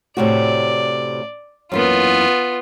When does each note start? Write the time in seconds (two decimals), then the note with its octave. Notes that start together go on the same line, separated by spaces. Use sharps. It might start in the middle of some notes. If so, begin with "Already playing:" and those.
0.17 A2 C3 F#4 D5
1.72 F#2 E3 A#3 B3 F4